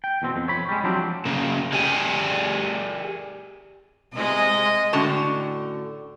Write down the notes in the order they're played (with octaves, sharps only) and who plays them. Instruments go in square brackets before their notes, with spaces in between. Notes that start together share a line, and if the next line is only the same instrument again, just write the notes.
[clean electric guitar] G5
E2 B2 C4
F2
C#5 B5
G3 G#3
F3 F#3 C4 D4 G4
[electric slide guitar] C#3 A#3
G4 G#4 A#4 D5 E5 G#5
[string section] C3 G#3 [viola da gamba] D#5
[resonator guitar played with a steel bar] A2 D3 C#4 F#4 A5